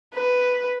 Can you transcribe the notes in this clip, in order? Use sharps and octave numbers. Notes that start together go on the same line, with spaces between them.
B4